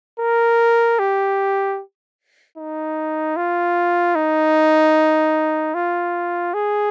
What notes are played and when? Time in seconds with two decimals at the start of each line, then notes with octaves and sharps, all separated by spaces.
0.20 A#4
0.99 G4
2.58 D#4
3.37 F4
4.16 D#4
5.75 F4
6.54 G#4